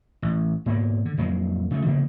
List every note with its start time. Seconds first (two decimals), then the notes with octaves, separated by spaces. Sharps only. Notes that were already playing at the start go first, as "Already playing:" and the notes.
0.22 A1
0.66 G#2 A#3 B3
1.05 D3
1.18 F2 F#3 G#3 A#3
1.71 C#3 A3
1.86 C#3 F3 A#3 B3